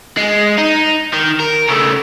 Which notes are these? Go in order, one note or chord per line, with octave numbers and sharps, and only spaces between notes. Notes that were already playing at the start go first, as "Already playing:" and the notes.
G#3
D#4
D#3
A#4
C#3 A3